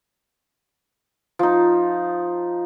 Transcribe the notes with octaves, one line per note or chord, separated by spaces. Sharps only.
F3 D#4